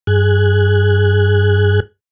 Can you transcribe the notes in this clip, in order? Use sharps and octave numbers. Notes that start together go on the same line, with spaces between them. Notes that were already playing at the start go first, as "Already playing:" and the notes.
G2 G#4 F#6 G#6